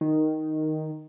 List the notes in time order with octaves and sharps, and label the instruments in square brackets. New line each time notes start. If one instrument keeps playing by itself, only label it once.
[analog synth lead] D#3